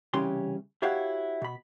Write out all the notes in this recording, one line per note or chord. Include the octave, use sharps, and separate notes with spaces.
C2 C#3 E3 C#4 G4 C6
E4 F#4 G4 C#5 F5 F#5
B2 B5